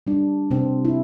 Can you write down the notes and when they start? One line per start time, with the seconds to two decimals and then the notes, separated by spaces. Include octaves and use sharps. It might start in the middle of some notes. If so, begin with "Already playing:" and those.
0.07 G3 D4
0.51 C3 C4
0.85 E4